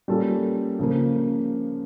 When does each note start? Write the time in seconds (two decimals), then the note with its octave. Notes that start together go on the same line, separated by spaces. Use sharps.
0.08 G3 A#3 C#4 F4 A4
0.79 C#3 F3 A#3